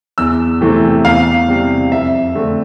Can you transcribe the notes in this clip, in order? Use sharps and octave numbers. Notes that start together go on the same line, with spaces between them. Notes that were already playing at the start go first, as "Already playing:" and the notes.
E2 E6
C3 E3 A3 C4
E2 F5
C3 G3 C4
F2 E5
D3 A3 C4